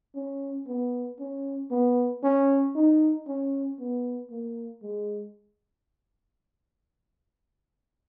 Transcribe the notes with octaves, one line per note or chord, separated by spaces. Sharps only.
C#4
B3
C#4
B3
C#4
D#4
C#4
B3
A#3
G#3